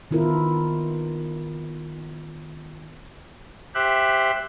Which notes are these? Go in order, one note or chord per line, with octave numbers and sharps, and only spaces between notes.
D#3 B3 E4 F4 A#4
G4 C5 E5 F#6